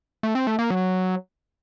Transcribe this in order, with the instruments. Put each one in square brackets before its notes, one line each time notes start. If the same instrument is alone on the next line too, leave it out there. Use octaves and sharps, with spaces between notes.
[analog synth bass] A3
C4
A3
A#3
F#3